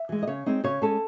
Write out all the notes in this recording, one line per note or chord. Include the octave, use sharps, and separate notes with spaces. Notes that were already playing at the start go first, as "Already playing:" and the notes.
Already playing: E5
E3 G#3
D#5
C#3 C#5
G#3 C4 D#4
C#3 C#5
G#3 C#4 A4